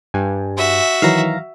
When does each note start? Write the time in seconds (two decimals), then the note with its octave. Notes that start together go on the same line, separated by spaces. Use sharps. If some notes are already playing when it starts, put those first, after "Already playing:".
0.14 G2 G#5
0.57 F#4 E5
1.02 D#3 E3 F#3 F5 A#5